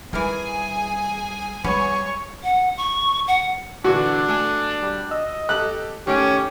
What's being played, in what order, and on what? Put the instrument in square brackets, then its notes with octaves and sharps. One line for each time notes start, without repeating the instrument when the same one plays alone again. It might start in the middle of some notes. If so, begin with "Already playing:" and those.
[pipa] E3 A#4 [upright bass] G3 [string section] G#4 G#5
[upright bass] G3 [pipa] B3 [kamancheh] C#5 C#6
[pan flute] F#5
C#6
F#5
[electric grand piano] A#2 D3 E3 [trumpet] D4 [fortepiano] F#4
[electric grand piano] A3 A4 G#5
[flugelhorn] G3
[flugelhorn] D#5 [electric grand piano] E6
[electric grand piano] G4 A4 [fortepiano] F#6
[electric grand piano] D#3 A3 D7 [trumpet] C#4 [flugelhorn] G4